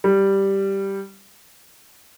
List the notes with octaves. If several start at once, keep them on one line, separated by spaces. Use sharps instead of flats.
G3